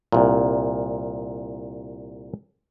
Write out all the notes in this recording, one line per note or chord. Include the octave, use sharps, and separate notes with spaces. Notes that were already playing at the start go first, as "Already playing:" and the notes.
C2 A#2